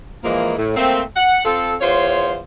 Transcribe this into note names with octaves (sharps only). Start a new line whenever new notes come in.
E3 F3 G#3 A#3
A2
A3 A#3 C4
F#5
C4 F4 A4
E2 F4 C5 C#5